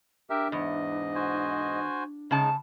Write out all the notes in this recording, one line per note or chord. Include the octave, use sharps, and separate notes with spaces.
D4 G4 A#4 E5
E2 G#2 D#5
F#4 C5 G#5
C#3 G#3 D#4 A5